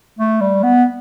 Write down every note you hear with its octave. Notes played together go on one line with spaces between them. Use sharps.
A3
G3
B3